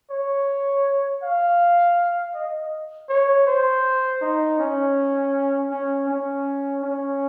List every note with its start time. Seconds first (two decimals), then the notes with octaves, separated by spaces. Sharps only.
0.11 C#5
1.23 F5
2.35 D#5
3.09 C#5
3.47 C5
4.21 D#4
4.59 C#4
5.70 C#4
6.09 C#4
6.83 C#4